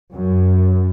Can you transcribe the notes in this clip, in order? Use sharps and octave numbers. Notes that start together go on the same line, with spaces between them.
F#2